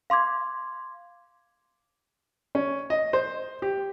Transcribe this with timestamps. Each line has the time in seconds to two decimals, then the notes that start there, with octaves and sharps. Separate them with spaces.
0.10 F5 C6 D6 G#6
2.55 C#4
2.90 D#5
3.13 C5
3.62 G4